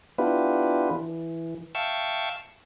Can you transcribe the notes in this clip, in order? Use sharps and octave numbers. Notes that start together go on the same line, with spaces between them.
B3 D4 E4 F4 G4 B4
E3
E5 F5 G5 A5 C#6 E6